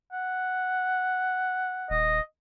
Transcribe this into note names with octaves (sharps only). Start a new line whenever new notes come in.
F#5
D#1 D#5